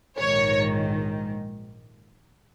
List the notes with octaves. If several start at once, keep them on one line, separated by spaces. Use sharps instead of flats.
A#1 G#2 D#3 C#5